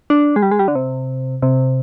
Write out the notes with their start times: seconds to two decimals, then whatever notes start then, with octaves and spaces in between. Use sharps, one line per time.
0.10 D4
0.36 G#3
0.42 G3
0.51 G#3
0.59 G3
0.68 D3
0.75 C3
1.42 C3